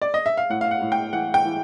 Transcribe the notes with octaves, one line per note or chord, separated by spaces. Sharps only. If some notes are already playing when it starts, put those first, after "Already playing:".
D5
D#5
E5
F5
A2 F#5
F5
F#5
A2
G5
E3 F#5
G5
E3